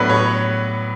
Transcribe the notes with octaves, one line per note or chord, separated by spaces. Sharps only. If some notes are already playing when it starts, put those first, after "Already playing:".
Already playing: A2 F#3 B3 D4 B4
C#5